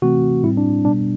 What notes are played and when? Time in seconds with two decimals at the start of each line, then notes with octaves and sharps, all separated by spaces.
0.02 C3 E3 A3 C4 F#4
0.43 A2 G3 C4 E4
0.57 D4
0.85 B2 G3 B3 D4